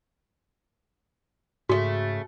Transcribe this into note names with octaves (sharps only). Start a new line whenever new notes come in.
G#2 C#3 A3 F#4